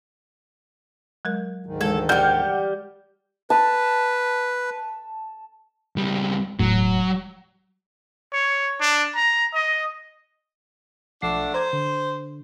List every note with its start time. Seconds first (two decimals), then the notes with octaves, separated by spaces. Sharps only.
1.25 F#3 G#3 A#4
1.66 D2 G#2 D#3
1.81 E3 G#3 A4
2.09 G3 G4 F#5 F6 G6
3.50 B4 A5
5.96 C#2 G3
6.60 E1 A2 F#3
8.33 C#5
8.80 D4
9.15 A#5
9.54 D#5
11.22 B1 F3 A3 D4 F#5 C7
11.54 C5 A#5 G#6
11.73 D3